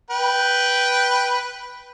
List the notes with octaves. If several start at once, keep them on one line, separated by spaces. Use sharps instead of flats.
B4 G5